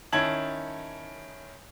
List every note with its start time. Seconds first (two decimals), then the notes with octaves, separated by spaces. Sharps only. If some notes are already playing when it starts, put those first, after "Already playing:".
0.12 D#3 C#4 E4 A5 G#6 F#7